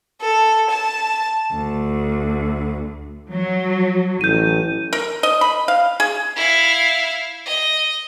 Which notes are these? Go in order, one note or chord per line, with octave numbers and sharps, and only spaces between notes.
A4
A5
D2
F#3
A1 G6 D#7
A#4
D#5
B5
F5
G#4
E4 F5
D#5